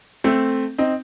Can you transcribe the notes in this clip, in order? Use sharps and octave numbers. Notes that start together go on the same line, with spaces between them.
A3 C4
C4 D#4